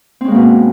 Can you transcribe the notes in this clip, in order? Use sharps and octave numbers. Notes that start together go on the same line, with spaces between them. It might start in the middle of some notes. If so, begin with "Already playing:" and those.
B2 G#3 A#3 C4 C#4